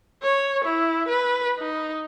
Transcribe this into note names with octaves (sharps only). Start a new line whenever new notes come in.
C#5
E4
B4
D#4